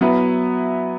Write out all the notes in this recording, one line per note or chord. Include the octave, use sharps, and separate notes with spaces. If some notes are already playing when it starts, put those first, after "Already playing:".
F#3 B3 E4 B4